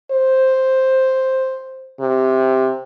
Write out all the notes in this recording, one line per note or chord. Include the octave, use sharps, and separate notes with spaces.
C5
C3